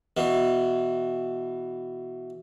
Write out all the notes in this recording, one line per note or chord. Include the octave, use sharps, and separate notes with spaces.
B2 E3